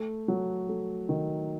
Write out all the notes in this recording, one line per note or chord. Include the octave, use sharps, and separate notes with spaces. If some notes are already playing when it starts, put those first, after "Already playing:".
Already playing: A3
F#3
A3
D#3